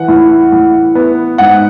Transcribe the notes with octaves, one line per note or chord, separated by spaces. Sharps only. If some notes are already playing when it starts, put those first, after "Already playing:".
Already playing: E3 F#5
A2
A2
B3
G#2 F#5